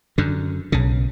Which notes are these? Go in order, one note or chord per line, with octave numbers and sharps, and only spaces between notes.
F#2 D3
B1 C#3